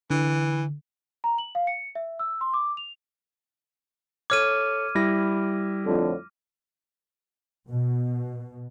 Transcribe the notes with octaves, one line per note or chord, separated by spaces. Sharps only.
D3 E3
A#5
F#7
F5
C#7
E5
E6
C6
D6
F7
A4 C#5 D6 F6 G#6 D#7
G3 E4 A#6
F2 A2 D3
B2